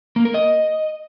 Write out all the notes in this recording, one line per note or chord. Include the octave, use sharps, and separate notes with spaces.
A#3
A#4
D#5